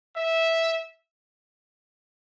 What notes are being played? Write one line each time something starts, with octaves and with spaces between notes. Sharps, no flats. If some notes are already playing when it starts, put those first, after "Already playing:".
E5